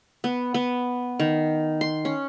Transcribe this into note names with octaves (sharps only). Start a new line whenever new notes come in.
B3
B3
D#3
C6
C#4